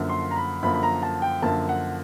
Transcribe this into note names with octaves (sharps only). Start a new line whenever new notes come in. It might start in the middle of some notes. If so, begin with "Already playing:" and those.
Already playing: F#2 D3 F3 A#3
C6
A#5
B5
F#2 D3 F3 A#3 B5
B5
A#5
A5
G5
F#2 D3 F3 A#3 A5
F#5